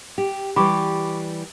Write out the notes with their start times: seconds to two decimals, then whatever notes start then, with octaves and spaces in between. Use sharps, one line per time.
0.18 G4
0.56 E3 G3 G4 B5 C#6 D6